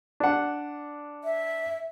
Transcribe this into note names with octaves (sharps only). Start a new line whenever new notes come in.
D4 F#5
E5